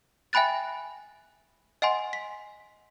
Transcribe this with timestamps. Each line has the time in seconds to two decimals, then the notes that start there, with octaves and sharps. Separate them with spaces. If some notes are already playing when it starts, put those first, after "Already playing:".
0.33 E5 G5 G#5 B5 F#6 A6
1.82 D#5 F#5 G#5 C6
2.13 B6